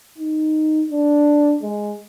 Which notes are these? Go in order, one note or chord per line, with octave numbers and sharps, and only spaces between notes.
D#4
D4
G#3